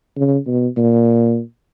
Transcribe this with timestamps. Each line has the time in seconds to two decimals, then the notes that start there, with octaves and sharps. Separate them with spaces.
0.16 C#3
0.46 B2
0.77 A#2